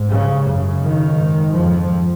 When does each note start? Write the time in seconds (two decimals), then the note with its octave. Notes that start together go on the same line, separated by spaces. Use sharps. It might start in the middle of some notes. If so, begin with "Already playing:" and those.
Already playing: G#2
0.09 C#3
0.45 F#2 C#3
0.81 D#3
1.16 G#2
1.52 F2 F3